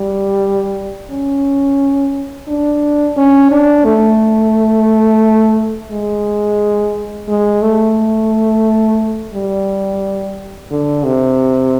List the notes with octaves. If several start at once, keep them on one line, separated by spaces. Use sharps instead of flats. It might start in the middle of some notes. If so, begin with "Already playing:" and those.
Already playing: G3
C#4
D4
C#4
D4
A3
G#3
G#3
A3
G3
D3
C3